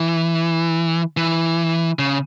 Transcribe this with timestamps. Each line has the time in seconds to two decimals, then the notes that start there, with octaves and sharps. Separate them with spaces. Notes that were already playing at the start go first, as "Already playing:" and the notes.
Already playing: E3
1.17 E3
1.99 C#3